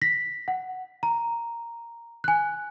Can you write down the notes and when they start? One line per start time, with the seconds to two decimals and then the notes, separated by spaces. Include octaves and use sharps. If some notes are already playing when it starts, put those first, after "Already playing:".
0.01 A#6 B6
0.48 F#5
1.03 A#5
2.24 G#5 F#6